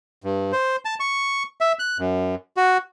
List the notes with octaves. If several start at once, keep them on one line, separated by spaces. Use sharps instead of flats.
G2
C5
A5
C#6
E5
F#6
F#2
F#4